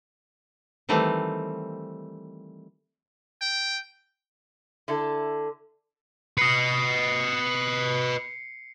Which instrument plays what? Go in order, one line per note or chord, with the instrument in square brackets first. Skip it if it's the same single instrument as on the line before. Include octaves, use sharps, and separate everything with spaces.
[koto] D#3 E3 G3 A3 C4
[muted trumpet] G5
[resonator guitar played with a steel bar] D3 E4 A4
[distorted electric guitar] B4 D#5 [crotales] C7 C#7